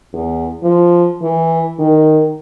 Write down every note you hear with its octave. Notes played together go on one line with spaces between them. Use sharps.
E2
F3
E3
D#3